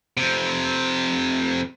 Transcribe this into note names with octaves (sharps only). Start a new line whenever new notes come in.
F2 C3